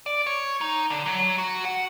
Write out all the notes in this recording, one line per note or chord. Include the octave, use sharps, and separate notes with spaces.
D5
C#5
D#4
D3
F#3
F#4
F#5